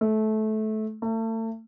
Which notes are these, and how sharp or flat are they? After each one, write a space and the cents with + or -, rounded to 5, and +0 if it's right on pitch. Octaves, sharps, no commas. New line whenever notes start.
A3 -20
A3 +35